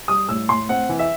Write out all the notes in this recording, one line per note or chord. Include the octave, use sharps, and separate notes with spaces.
G3 D#6
A2 E6
A2 C6
C4 F#5
E3
E5